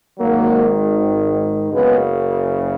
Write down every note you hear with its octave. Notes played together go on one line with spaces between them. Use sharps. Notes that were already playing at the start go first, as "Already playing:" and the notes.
G#1 G#2 D#3 F#3 A#3
F#1 F#2 C#3 G#3 B3